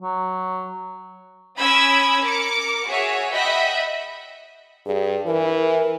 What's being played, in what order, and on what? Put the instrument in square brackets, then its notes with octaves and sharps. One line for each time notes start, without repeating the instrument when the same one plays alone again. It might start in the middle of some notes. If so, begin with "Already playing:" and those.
[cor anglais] F#3
[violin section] C#4 B5 D#6 E6 G#6 D7
A#4 D6 C#7
F#4 G#4 C#5 E5
D#5 E5 F#5 G5 B5 B6
[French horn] G2 [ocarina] G#4
[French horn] E3 [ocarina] A#4